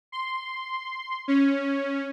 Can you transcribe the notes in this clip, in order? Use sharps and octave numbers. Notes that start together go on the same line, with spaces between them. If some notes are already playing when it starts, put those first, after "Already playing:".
C6
C#4